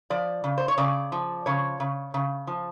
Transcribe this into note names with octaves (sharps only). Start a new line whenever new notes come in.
F3 D5
C#3
C5
C#5
C#3 D5
F3
C#3 C#5
C#3
C#3
F3